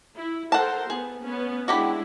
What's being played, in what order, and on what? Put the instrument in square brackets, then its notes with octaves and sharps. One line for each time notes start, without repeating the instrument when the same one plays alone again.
[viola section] E4
[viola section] A4 A#4 C5 [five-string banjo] F#5 A5
[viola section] B3 [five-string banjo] G#4
[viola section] B3 C#4
[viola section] G#3 D4 E4 [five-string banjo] F#4 G4 B5